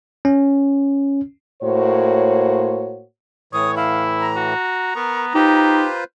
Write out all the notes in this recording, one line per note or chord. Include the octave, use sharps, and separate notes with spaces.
C#4
A2 A#3 F#4 C5 C#5
A2 E3 C#5 D#6
E4 F5
A#5
F#4
B3 A#4 C#6
D#4 F4 G4 B4 C5